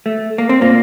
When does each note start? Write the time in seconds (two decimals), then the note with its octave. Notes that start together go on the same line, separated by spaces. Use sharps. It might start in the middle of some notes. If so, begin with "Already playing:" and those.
0.06 A3
0.38 A#3
0.49 C4
0.61 A#2 A#3